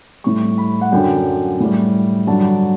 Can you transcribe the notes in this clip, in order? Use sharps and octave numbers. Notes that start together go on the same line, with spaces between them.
A2 G3 C#6
B5
F#5
F#2 D3 F#3 G5
A2 G3
G2 D3 F#3 A5